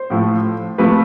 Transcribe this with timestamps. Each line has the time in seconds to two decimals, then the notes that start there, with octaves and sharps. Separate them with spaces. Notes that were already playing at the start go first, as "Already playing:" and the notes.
Already playing: C5
0.10 A2 F3 A3
0.78 C3 F3 A3 B4